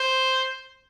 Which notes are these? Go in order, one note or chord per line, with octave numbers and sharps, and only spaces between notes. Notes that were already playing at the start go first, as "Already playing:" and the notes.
Already playing: C5